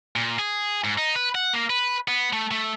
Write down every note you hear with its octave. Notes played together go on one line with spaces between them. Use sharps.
A#2
G#4
G#2
D#4
B4
F#5
A#3
B4
B3
A3
A3